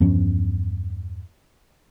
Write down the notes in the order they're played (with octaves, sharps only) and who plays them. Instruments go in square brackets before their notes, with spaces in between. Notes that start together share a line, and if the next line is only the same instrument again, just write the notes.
[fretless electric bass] E2 G2 F3 C#4